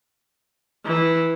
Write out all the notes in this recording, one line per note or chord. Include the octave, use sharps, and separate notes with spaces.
E3